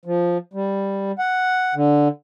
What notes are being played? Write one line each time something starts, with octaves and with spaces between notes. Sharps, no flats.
F3
G3
F#5
D3